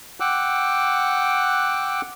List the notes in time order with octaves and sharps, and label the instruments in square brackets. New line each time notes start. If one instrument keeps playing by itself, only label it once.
[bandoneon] F#5 G5 D6 E6 F#6